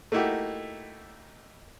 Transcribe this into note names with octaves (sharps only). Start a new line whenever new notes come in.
A3 A#3 D#4 E4 F#4 G4